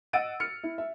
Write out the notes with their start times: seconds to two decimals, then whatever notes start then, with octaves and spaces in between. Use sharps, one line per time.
0.13 D#5 F#5 E6 A6 D7 D#7
0.40 F6 C#7
0.63 E4
0.78 E5